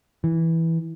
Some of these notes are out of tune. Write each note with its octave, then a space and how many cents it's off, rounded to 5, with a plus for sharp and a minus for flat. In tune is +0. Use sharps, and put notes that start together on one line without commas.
E3 -5